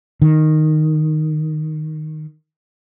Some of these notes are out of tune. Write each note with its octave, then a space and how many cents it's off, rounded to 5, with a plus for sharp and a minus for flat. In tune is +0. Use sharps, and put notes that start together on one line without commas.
D#3 -5